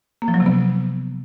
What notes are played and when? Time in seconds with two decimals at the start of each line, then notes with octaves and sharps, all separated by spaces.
0.22 A#3
0.28 F3
0.34 F#3
0.40 C3
0.46 B3